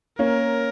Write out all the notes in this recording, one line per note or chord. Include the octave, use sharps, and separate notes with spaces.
A#3 C#4 A#4